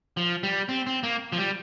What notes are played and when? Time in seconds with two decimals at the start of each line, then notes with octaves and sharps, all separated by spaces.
0.17 F3
0.43 G3
0.69 C4
0.87 C4
1.03 A#3
1.32 F3
1.38 G3